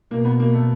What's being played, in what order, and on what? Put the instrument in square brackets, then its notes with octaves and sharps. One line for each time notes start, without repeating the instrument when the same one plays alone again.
[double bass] B2 [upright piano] A#3
[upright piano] B3
A#3
A3